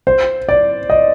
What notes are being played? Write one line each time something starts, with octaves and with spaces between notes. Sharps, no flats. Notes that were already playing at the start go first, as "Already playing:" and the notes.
C5
D5
D#5